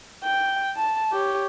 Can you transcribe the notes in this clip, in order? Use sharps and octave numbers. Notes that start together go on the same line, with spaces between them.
G5
A5
G4 C#5